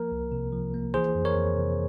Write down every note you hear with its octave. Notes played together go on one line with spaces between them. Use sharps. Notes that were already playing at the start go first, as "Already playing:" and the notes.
Already playing: F3 A#3 A#4
C2
C3
F3
A#3
E3 G#4 C5
F2
A#4 C#5
F2
C3